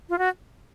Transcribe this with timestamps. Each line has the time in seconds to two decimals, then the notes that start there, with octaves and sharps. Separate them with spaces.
0.10 F4
0.18 F#4